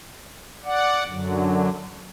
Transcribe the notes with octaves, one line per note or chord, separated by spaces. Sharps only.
D5 F#5
F#2 D3 F#3